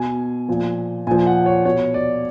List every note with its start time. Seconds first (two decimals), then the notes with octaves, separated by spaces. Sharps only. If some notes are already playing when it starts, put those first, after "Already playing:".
Already playing: B2 G#5
0.48 A#2 F3
1.07 A#2 F3 G#5
1.26 F#5
1.46 C#5
1.65 B2 C#5
1.94 D5